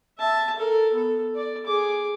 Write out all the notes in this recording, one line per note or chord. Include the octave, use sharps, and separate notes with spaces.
E5 A5
A4 A#4
B3 A4
D5
G#4 D6